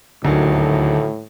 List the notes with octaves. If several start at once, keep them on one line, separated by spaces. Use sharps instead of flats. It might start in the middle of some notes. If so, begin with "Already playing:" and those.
D#1 D2 A2 D3 D#3 F#3